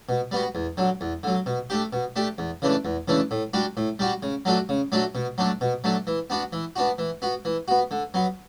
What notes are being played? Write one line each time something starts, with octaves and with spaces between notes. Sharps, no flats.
B2
G3 B3 F#4
E2
D3 F#3
E2
D3 F#3
B2
A3 D4 G4
B2
A3 D4 G4
E2
C#3 E3 A3 D4
E2
C#3 E3 A3 D4
A2
G3 D4 F#4
A2
G3 D4 F#4
C#3
F#3 A3 D4 F#4
C#3
F#3 A3 D4 F#4
B2
F#3 A3 D4
B2
F#3 A3 D4
E3
B3 D4 F#4
E3
B3 D4 F#4
E3
B3 F#4
E3
B3 F#4
D3
F#3 B3